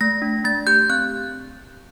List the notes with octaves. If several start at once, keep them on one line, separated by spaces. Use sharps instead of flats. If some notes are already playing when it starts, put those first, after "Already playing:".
A3 A#6
D4
A3 A6
G4 G6
C4 F#6